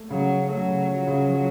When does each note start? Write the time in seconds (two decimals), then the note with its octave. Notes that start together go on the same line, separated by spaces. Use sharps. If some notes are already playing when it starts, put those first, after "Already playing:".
Already playing: A3
0.10 C#3 F#3
0.30 C#4
0.49 F#3 A3
0.68 C#3
0.88 F3
1.07 C#3
1.26 F3